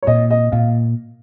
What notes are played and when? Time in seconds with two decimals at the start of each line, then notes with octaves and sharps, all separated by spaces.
0.03 C#5
0.07 A#2 D#5
0.30 D#5
0.52 A#2 F5